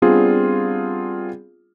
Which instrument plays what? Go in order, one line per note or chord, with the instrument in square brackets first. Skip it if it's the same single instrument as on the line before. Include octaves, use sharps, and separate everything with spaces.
[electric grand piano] G3 B3 C4 D4 F4 G#4